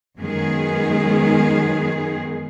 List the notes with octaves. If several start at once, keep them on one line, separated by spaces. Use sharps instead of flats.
F#2 D#3 G#3 B3 G#4